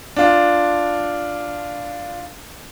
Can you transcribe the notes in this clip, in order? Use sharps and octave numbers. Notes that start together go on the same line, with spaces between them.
D4 F4